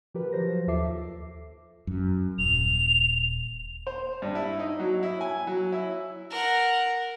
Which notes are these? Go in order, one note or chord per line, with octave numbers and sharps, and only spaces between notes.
F3 G4 A#4 B4
F3 F#3 C5 A#6
D#2 F4 A4 E5 D6 C7
F#2
D#1 F7
C5
G2
E4
D#4
F#3
E4
G#5
F#3
E4
A#4 F#5